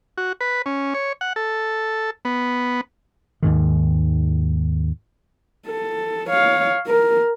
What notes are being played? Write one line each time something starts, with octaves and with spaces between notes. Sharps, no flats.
F#4
B4
C#4
C#5
F#5
A4
B3
D#2 G#2 D#3
A4
C#5 F5
A#4